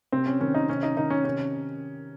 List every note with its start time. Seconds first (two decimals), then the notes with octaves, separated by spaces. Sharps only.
0.12 C3 C4
0.27 C#4
0.41 D#3 C#4
0.54 D#4
0.69 C3 C#4
0.83 D#4
0.96 D#3 D#4
1.10 C#4
1.25 C3 C#4